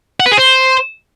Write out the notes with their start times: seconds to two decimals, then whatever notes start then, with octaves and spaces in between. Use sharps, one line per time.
0.20 F#5
0.26 B4
0.32 G#4
0.37 C5